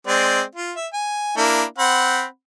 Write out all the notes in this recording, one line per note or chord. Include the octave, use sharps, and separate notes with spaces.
G#3 C4 D5
F4
E5
G#5
A#3 D4 E4
C4 F#5 B5